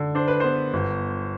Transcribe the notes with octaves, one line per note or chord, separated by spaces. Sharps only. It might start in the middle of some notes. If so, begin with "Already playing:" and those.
Already playing: D3
D4 C5
B4
B3 C5
G1